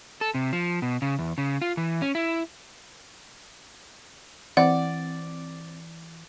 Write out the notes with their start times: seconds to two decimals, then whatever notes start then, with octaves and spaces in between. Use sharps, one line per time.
0.21 A4
0.35 C3
0.53 F3
0.82 B2
1.02 C#3
1.19 E2
1.38 C#3
1.62 F4
1.77 E3
2.02 C#4
2.15 E4
4.57 E3 C4 D5 F#5